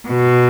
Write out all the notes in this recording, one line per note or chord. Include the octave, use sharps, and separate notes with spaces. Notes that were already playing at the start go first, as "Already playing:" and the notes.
B2